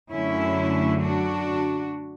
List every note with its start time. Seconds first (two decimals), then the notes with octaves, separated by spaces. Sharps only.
0.12 F#2 D3 F#3 A3 C#4 E4
1.02 D4 F#4